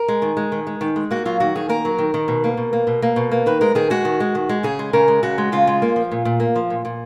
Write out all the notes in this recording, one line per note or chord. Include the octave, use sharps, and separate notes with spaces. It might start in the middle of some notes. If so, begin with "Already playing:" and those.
Already playing: A#4
G#3
D#3
G#3
D#3
G#3
D#3
G#3
A#3 F#4
F#3 F4
D#3 F#4
D#3 G#4
A#3 A#4
F#3
D#3
D#3
B2
A#3
B2
A#3
B2
A#3
B2
A#3
D#3 B4
G#3 A#4
D#3 G#4
G#3 F#4
D#3
G#3
D#3
G#3
C#3 G#4
G#3
C#3 A#4
G#3
C#3 F#4
G#3
C#3 F4
G#3
A#3
F3
A#2
A#2
A#3
F3
A#2
A#2